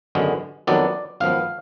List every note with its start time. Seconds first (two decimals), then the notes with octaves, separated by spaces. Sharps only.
0.15 G#1 F#2 D3 G#3 B3
0.67 F2 D#3 F#3 B3 D4 D5
1.20 G#1 F#2 F3 B3 F5